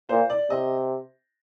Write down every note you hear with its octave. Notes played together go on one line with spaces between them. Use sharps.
A#2 C5
D5
C3 D#5